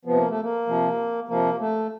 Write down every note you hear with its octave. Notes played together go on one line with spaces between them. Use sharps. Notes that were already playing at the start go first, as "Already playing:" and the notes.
C3 F3 B3
A#3
A3
A#3
C3 F3
C3 F3 A#3
A3